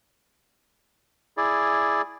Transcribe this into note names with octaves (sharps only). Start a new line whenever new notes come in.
E4 G#4 D5